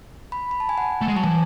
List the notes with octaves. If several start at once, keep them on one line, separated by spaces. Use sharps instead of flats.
B5
B5
A5
G#5
F#5
A3
G#3
F#3 A5
E3 G#5